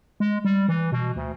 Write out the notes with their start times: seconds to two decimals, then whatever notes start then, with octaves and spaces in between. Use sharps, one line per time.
0.20 G#3
0.45 G3
0.68 E3
0.92 B2
1.16 D2